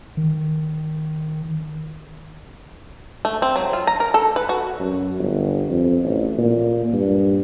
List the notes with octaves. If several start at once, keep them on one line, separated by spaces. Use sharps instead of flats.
D#3
A3
C4
F#3
F4
A#5
A#4
A4
B4
F#4
F#2
G1
F2
A1
A#2
G2